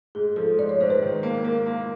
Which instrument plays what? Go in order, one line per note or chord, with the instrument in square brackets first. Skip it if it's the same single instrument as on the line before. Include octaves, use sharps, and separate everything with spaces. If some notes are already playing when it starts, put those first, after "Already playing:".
[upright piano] G#2 [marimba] G#4
[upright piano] F3 [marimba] A4
[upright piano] G#2 [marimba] D5
[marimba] C#5
[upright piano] G#2 [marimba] C5
[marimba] B4
[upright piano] D#3
A#3
[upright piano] A#3 [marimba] A#4
[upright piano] A#3